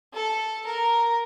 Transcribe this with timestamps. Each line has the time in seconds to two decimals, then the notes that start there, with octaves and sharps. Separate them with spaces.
0.14 A4
0.66 A#4